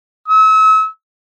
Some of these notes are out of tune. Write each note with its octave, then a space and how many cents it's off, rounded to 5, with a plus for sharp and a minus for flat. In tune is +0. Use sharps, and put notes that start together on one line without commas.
E6 -40